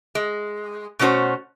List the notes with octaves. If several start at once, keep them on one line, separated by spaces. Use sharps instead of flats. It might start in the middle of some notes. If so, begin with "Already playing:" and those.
G#3
B2 A3 C#4 F#4 C5